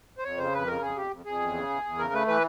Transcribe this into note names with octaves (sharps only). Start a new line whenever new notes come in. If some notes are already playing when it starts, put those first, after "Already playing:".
C5
F2 C#5
C#3 C5
F2 B4
C#3 A#4
F2 G#4
F2 G4
F2
F2 G#4
E2
C#3
E2
E2
C#3 A#4
A3 B4
E3 B4